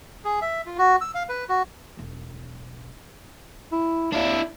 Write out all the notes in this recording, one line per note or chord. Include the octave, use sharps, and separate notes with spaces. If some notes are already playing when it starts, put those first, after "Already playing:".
G#4
E5
F4
F#4
E6
F5
B4
F#4
E1 B1
E4
D#2 D4 E4